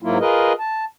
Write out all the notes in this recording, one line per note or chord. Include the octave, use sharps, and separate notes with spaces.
G#2 F#3 A#3 E4 F4
F4 G#4 A#4 B4 D#5
A5